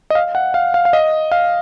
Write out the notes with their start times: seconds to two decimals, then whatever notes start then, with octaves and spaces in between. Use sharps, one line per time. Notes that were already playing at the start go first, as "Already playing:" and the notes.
0.10 D#5
0.15 F5
0.35 F#5
0.54 F5
0.74 F5
0.85 F5
0.93 D#5
1.32 F5